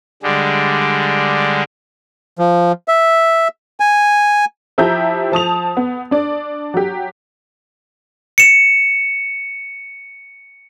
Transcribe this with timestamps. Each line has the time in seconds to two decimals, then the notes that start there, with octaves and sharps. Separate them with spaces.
0.23 D3 G3 G#3
2.39 F3
2.88 E5
3.80 G#5
4.78 F3 E4 G4 A#5 G6
5.32 F3 A5 D#6 F7
5.77 B3
6.11 D4 D5
6.74 F#3 G4
8.38 C#7 E7